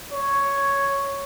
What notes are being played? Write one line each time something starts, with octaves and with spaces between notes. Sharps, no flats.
C#5